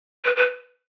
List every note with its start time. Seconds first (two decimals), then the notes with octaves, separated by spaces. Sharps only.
0.25 B4
0.36 B4